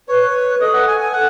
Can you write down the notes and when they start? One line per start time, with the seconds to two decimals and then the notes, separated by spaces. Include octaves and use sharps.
0.08 B4 C#5
0.61 A4 D#5
0.74 F#5
0.88 G#5
1.00 G#5
1.13 F#5